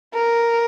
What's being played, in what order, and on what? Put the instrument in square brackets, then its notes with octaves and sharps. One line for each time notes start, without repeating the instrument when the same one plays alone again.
[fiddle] A#4